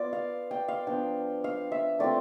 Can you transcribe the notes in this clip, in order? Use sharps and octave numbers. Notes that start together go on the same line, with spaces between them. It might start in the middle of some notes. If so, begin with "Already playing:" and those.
Already playing: B3 F4 D5
F5
G5
F5
F3 B3 D4 G5
F5
E5
A3 C4 F4 D5